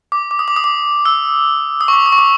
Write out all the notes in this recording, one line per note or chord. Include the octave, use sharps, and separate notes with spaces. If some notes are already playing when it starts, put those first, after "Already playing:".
D6
D6
D#6
D6
D#6
D6
E6
D#6
C#6
D6
D#6
C#6
D6